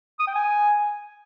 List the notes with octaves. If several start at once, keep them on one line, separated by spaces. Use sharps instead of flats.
D#6
G5
G#5